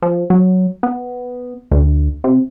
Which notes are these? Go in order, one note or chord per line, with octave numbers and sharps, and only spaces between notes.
F3
F#3
B3
D2
C3